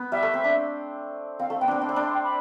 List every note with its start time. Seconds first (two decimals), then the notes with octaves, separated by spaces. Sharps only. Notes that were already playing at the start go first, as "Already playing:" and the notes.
Already playing: B3
0.12 G3 E5
0.23 A3
0.34 C4
0.44 D4
1.39 C4 F5
1.50 A3
1.60 B3 G5
1.68 C4 D4
1.81 D4 A5
1.89 C4 B5
1.96 D4
2.03 C6
2.14 G5
2.24 B5